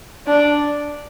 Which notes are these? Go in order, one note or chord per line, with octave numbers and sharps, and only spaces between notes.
D4